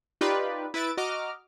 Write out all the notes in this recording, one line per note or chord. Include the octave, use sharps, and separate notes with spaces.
D#4 F4 G4 B4 D5
E4 B4 E5 A6 D7
F#4 D#5 A#5 D6 F6